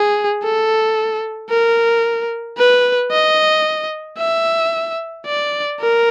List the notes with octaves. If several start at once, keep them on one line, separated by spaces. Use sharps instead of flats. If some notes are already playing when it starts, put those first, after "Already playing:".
Already playing: G#4
A4
A#4
B4
D#5
E5
D5
A#4